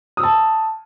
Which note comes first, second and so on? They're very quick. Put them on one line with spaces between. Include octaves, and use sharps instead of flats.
D#6 E6 A5